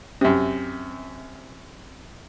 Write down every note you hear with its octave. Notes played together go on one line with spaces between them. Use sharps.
F#2 C3